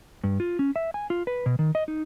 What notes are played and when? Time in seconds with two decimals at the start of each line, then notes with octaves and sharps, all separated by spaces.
0.24 G2
0.40 F4
0.59 C#4
0.76 E5
0.94 G#5
1.10 F4
1.27 B4
1.46 B2
1.59 D#3
1.75 D#5
1.88 D#4